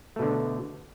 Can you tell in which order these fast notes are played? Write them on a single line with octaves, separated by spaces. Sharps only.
A3 B2 D3